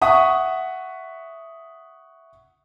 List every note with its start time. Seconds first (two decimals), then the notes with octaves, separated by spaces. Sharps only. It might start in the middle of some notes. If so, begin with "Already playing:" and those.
0.01 E5 F#5 C#6 D#6